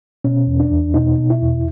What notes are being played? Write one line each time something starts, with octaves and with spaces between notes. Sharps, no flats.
B2 C#4
E2
D4
E2
B2 D#4
B2
E4
E2